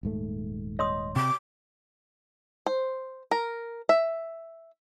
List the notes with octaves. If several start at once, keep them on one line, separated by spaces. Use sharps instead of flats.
D#1 G#2 A3
C#5 D#5 C6 D#6
C3 D6
C5
A#4
E5